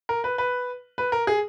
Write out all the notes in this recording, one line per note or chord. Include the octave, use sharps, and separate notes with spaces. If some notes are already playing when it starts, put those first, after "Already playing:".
A#4
B4
B4
B4
A#4
G#4